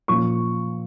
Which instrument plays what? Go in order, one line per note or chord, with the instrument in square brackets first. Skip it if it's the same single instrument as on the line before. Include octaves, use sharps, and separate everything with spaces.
[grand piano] A#2 F3 A#3 C#4 F4 C#6